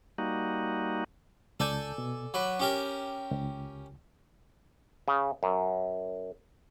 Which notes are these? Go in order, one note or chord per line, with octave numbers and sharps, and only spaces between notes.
G3 A#3 D#4 F#4
C#2 A4 D5 G#5 A5 G6
B2
F#3 B4 D6
C#4 G4 A#4
C#2
C#3
F#2